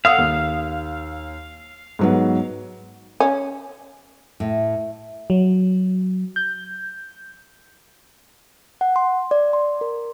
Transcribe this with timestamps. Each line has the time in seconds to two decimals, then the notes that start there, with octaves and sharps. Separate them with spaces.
0.05 F5 F#5 D#6 E6
0.18 D#2
1.99 G#2 F#3 B3
3.20 C#4
4.40 A2
5.30 F#3
6.36 G6
8.81 F#5
8.96 C6
9.31 D5
9.53 C6
9.81 A#4